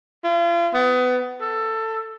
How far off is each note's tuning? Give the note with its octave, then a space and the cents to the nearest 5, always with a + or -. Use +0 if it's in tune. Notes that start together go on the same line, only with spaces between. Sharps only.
F4 -40
B3 +25
A4 +15